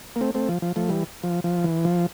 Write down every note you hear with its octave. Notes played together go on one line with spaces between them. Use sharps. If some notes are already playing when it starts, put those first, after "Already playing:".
A#3
A3 C4
A3 C4
F3
F3
F3 A3
E3 G3
F3
F3
E3
F3